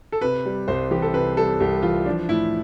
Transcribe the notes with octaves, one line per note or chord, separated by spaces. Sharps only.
A4
C3 B4
G3
C2 C5
E3 G4
A4
C3 B4
G3 A4
C2 G4
E3 F4
F3 D4
A2 E4